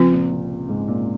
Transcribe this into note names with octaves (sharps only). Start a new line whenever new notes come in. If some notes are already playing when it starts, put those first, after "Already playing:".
Already playing: C#2 C#3 F3 C4 F4
A#2
C3
G#2 G#3
A#2 A#3